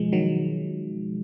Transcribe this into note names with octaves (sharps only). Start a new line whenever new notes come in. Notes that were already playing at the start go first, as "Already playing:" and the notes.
Already playing: B2 F3 G#3
D#3 F#3